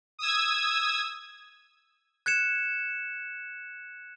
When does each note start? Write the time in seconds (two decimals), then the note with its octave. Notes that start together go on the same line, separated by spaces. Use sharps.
0.19 D#6 E6 G#6
2.26 F#6 G#6 C#7 E7